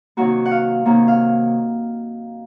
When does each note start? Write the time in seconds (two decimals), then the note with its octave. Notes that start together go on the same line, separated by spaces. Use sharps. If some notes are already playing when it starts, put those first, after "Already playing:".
0.17 C3 D#3 F#3 A#3 F#4
0.46 F#5
0.51 F5
0.85 C3 D#3 F#3 A#3
1.08 F5